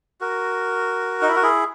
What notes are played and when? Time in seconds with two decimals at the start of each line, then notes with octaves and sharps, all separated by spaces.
0.21 F#4 A#4
1.21 D#4
1.28 E4
1.36 F#4
1.42 E4 G#4